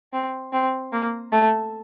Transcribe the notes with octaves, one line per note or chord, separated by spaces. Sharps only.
C4
C4
A#3
A3